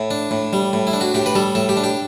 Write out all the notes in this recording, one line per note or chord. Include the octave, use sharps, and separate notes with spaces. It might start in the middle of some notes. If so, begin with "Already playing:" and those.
Already playing: A2 E5
D4
A2
G3
A2
E4
D4
F#4
A2 G4
B4
G3 A4
A2 A4
G4
D4
G4